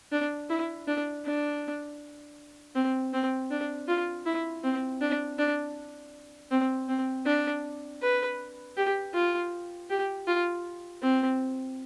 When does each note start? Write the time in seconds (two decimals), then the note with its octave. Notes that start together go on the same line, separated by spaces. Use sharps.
0.12 D4
0.50 E4
0.88 D4
1.25 D4
2.75 C4
3.13 C4
3.51 D4
3.88 F4
4.26 E4
4.64 C4
5.01 D4
5.39 D4
6.51 C4
6.89 C4
7.26 D4
8.02 B4
8.77 G4
9.14 F4
9.90 G4
10.27 F4
11.02 C4